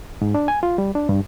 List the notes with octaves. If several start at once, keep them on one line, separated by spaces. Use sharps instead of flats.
G#2
D4
G#5
F4
G3
D4
G2